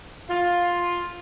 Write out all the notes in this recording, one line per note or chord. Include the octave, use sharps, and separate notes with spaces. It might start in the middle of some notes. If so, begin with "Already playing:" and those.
F4